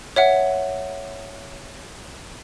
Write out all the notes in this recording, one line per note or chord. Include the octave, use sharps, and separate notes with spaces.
C#5 E5 F#5